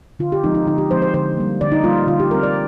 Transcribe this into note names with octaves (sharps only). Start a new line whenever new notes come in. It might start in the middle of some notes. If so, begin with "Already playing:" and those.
D3 F4
G4
F3 G#3 C4 D#4
D#4
D3 D#4
G4
F3 G#3 C4 C5
C5
D3 C5
G3 A#3
D3 D5
D#4
G3 A#3 F4
D3 F4
G4
G3 C4 A#4
D5